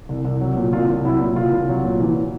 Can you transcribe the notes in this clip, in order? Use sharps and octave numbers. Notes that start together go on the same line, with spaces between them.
C2
C2
F#3
A#2
C2 F4
C2
F#3 E4
A#2
C2 F4
C2
F#3
A#2
E3